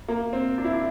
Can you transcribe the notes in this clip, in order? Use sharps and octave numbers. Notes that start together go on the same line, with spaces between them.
A#3
C4
D4
E4
D4